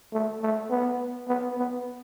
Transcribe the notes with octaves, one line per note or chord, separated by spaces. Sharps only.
A3
A3
B3
B3
B3